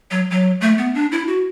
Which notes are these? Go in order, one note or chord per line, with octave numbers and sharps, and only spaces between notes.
F#3
F#3
A3
B3
D4
E4
F#4